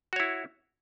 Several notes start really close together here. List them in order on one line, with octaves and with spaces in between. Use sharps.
F#4 C#5 E4